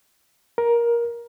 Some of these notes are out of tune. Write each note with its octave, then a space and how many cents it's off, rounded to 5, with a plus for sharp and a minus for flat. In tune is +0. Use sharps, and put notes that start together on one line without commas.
A#4 +15